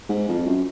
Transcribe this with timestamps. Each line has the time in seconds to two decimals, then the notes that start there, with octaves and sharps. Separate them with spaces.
0.09 G#2
0.29 F2
0.46 F#2